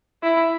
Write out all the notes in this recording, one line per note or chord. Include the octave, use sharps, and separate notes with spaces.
E4